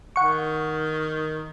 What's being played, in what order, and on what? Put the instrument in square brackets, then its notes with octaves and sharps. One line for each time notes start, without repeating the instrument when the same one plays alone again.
[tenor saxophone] D#3 [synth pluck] F#5 C#6